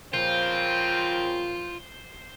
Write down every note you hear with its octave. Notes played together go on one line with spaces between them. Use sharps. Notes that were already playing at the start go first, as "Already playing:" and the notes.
A#2 C#3 F3 A#3 C4 F4 C5